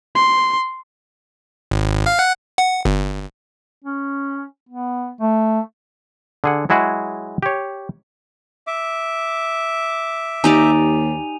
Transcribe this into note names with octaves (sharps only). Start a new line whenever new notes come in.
C6
G#1
F5
F#5
F#5
G1
C#4
B3
A3
D3 G#4 F#5
F#3 G#3 E4 F#4 G#4
G4 C#5
E5 D6
D#2 D#4 G4 D5 G#5 D#7 F7